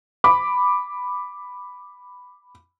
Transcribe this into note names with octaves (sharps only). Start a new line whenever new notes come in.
B5 D6